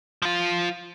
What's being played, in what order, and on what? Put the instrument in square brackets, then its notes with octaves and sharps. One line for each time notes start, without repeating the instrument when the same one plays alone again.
[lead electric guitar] F3 F4